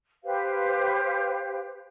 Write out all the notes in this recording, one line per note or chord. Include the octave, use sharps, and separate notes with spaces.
G4 B4 C5 F5